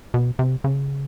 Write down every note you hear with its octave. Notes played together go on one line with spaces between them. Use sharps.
B2
C3
C#3